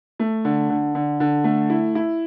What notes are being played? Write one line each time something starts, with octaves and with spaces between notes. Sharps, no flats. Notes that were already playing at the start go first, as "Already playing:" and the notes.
A3
D3
D3
D3
D3
A3
E4
E4